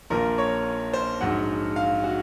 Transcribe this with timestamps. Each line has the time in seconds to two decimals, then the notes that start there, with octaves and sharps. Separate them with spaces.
0.10 A#1 A#2 F3 A#4
0.38 C#5
0.93 C5
1.21 A#1 G#2 F#3 F#5
1.76 F5
2.04 F#4